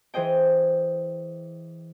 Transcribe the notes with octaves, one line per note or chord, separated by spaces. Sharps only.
E3 G#4 C5 D#5 G5